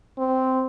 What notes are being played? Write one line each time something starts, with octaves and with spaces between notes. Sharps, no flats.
C4